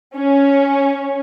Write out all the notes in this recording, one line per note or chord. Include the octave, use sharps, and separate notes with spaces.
C#4